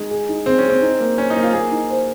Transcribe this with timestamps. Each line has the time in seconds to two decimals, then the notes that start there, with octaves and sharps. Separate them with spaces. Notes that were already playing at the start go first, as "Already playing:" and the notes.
Already playing: G#3 D#4 G#4
0.11 G#4
0.29 D#4
0.46 C4 G#4
0.58 C#4
0.64 G#4
0.70 C4
0.82 D#4
1.00 A#3
1.18 C#4 C5
1.30 D#4
1.36 A#3
1.42 F4
1.53 A#3 G#4
1.72 D#4
1.90 C5